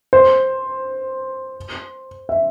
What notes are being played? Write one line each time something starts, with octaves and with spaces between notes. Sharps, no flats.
C5
E5